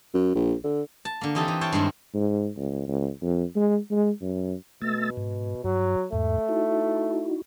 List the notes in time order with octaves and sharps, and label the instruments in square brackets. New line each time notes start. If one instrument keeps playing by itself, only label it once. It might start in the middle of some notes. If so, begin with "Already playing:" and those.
[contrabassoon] F#2
A#1
D3
[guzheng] A5
D3 A#3
E3 C4 D#4 G4 A4
E3
E4 C#5 F5 G5 A5
G2 D#3 G#3 C4 E4
[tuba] G#2
C#2
C#2
F2
G#3
G#3
F#2
[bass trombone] B2 [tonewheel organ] A3 E6 A6
[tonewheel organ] G#2
[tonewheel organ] G2 [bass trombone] F#3
[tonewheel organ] E2 G#2 [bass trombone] A3
[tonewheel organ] D#4 E4 F#4